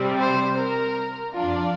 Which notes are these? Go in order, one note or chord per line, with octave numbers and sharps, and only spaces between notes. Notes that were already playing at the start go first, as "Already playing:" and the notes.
Already playing: C3 G3 C4
C5
A#4
F2 F3 D4 F4